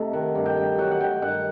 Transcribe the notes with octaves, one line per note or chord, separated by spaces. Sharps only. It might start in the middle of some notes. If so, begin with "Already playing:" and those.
Already playing: C3 A3 D#4
D#3 F#5
G2
G5
G2
F#3 F#5
F#5
D#3 G5
G2 F#5